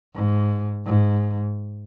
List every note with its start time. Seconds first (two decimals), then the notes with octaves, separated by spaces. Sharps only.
0.15 G#2
0.86 G#2